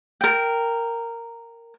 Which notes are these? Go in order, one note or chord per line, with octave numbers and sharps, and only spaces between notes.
A#4 G5